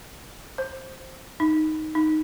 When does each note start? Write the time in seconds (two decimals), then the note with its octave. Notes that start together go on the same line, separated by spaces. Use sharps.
0.58 C5
1.40 D#4
1.95 D#4